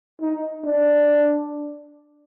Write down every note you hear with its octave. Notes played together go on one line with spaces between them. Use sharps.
D#4
D4